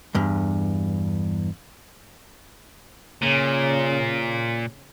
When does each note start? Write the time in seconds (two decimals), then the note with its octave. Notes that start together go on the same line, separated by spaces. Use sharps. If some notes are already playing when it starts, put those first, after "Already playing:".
0.15 E2 G2
3.22 A#2 C#3